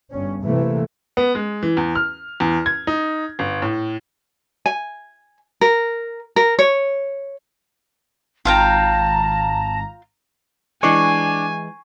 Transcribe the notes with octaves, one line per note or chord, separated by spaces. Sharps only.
G1 G2 C#4
C3 E3 A3 A#3
B3
G#3
E3
E2
F6
E2
G#6
D#4
G1
A2
G#5
A#4
A#4
C#5
G#1 F4 F5 G5 A5 A#5
E3 G#3 D4 G#5 C#6 D6 C7